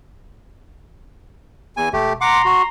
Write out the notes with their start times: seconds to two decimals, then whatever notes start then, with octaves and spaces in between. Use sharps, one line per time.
1.77 E2 G#5
1.93 E1 A3 G4
2.21 F#5 A#5 C6 D6
2.45 F#4